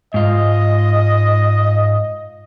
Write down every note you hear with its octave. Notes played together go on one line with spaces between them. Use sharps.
G#2 F4 D#5